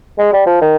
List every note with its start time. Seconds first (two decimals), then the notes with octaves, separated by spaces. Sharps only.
0.19 G#3
0.32 G3
0.46 F3
0.61 D#3